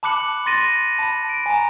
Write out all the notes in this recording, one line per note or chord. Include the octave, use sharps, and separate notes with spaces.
A5 B5 D6 F#6 C#7 F#7
C6 A6 A#6 D#7
A5 B5
D7
G#5 A#5